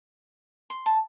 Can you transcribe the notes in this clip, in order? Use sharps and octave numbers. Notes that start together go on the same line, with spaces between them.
C6
A5